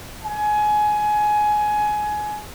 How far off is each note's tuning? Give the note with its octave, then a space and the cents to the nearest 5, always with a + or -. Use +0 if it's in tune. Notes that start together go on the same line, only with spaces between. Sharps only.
G#5 +20